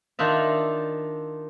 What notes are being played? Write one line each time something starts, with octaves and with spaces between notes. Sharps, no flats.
D#3 D4 D#4 F4 E5